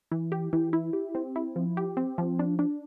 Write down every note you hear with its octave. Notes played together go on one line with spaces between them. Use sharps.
E3
G4
E3
E4
G4
C4
E4
F3
G4
C4
F3
D4
D4